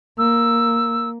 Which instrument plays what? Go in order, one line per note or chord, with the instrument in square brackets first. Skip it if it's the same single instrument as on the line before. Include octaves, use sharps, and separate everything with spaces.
[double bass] A#3 [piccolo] E6